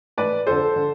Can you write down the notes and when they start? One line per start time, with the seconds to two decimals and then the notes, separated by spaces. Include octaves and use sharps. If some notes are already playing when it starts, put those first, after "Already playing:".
0.17 A2 E3 B4 D5
0.47 F2 D3 A4 C5
0.76 D3